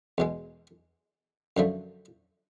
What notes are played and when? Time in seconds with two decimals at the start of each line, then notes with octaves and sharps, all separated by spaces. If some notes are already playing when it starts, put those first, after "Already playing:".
0.18 E2 B2 G#3
1.57 F#2 D3 F3 A3